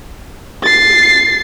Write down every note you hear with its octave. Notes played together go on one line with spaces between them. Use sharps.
A6 C7